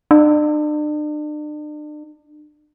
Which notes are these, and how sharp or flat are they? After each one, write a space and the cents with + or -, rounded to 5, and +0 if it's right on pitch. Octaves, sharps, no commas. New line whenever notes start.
D4 +40